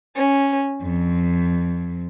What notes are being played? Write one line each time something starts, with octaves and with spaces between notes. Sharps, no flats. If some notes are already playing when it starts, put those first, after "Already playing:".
C#4
F2